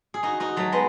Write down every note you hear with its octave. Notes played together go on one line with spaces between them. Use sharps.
G#4
D#4 F#4
D#4 F#4
F#3 A3
G#3 B3